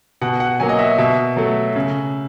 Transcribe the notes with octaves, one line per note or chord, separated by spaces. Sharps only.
B2 F#5
F#5
F#3 A#3 G#5
D#5
E5
B2 E5
F#3 A3
C#3